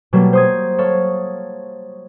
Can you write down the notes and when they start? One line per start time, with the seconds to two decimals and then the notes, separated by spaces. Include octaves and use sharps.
0.13 B2 F#3 G3 A3 A#3
0.33 C5 D#6 G#6
0.78 A4 C#5 F5